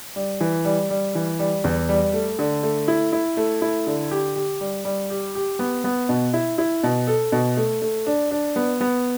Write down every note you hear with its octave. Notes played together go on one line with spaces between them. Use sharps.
G3
E3
G3
G3
E3
G3
E2
G3
A3
D3
A3
E4
E4
A3
E4
D3
G4
G4
G3
G3
G4
G4
B3
B3
B2
E4
E4
B2
A4
B2
A3
A3
D4
D4
B3
B3